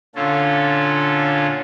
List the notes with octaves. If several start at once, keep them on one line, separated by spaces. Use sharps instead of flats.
A#2 D3 C#4 F4 A4